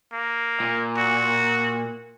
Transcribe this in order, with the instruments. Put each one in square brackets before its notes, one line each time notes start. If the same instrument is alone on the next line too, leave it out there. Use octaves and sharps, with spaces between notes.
[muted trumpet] A#3
[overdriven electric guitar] A#2
[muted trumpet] F#4